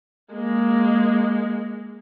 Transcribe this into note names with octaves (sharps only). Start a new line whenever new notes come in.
G#3 A#3